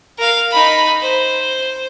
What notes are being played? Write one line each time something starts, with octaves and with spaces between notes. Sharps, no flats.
A#4 F5
D#4 B5
C5